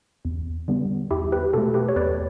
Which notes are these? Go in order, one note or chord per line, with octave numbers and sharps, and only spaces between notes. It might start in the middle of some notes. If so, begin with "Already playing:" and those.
E2
D3 G3 B3
E2 E4 G4
G4 B4
B2 A3 F#4 A4
G4 B4
C#5
E2 B4 D5